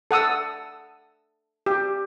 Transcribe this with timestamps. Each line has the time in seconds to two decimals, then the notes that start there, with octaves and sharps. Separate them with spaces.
0.11 A4 F#5 D#6 E6
1.66 G4